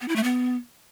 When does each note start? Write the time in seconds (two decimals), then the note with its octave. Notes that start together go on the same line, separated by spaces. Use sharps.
0.01 B3
0.08 E4
0.16 A3
0.23 B3